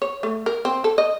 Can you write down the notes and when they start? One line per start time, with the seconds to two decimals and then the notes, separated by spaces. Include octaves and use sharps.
0.02 C#5
0.23 A3
0.46 A#4
0.65 C4
0.84 A4
0.98 D#5